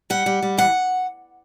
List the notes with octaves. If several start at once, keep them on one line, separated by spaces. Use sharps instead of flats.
G3 F#5
G3
G3
E3 F#5